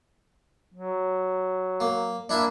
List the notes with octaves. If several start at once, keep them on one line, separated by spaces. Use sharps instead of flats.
F#3
A#3
A#3 D4 E4 E5